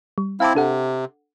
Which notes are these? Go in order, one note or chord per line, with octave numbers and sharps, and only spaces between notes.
G3
C4 E4 F5 A5 D6
C3 D4 A4 F#5